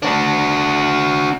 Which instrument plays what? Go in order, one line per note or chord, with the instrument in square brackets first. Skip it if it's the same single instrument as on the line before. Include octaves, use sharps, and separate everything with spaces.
[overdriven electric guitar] D4 F#4